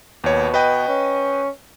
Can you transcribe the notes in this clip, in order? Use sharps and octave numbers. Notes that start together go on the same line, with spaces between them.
D#2 B2 C#5
B4 D#5 G5
C#4